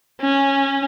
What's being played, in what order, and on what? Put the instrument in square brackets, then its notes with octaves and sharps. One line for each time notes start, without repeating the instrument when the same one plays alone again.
[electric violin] C#4